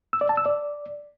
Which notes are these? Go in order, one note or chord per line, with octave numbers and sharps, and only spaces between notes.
E6
D5
A5
E6
D5